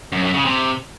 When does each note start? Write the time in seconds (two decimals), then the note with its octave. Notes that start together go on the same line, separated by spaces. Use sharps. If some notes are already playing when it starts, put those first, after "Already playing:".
0.12 F#2
0.23 F#2
0.34 C#3
0.45 C3